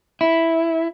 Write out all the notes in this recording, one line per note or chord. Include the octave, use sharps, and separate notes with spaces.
E4